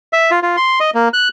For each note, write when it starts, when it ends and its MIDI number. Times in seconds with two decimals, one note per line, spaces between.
0.13 0.31 76
0.31 0.40 65
0.43 0.56 65
0.57 0.79 84
0.80 0.90 75
0.94 1.09 58
1.14 1.28 90